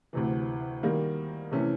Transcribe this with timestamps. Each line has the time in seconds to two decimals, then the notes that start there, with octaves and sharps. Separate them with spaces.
0.13 D2 C3 E3
0.83 D#3 G3 A#3
1.51 C3 E3 A3 C#4